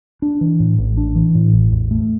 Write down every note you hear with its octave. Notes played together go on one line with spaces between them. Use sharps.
D4
E3
A2
A1
D4
E3
A2
A1
E2
A3